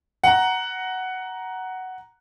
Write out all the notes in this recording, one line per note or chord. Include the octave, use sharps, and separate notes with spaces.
F#5 A#5